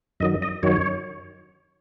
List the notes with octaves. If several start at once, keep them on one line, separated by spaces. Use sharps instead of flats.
F#2 D#3 F#3 D#5
D#5
F#2 D#3 F#3 C#5